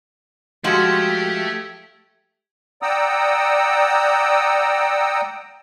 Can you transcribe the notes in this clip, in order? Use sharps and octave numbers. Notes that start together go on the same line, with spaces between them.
F3 G#3 A3 F#4 G4 E6 G#6
D5 F#5 G5 A#5 D#6 E6